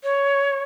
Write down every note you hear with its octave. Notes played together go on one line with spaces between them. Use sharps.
C#5